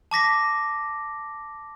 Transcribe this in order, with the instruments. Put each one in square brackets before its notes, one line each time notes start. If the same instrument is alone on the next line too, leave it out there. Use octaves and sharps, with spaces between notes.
[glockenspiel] A5 D6 A#6 B6